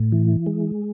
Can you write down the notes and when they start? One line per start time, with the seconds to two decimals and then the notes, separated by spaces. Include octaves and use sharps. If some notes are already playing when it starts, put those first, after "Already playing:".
Already playing: A2
0.12 E3
0.46 G#3